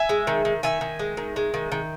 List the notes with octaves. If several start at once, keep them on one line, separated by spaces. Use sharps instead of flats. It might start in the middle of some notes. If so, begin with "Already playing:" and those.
Already playing: E5 G#5
G#3
D#3
D#3
D#3 E5 G#5
D#3
G#3
D#3
G#3
D#3
D#3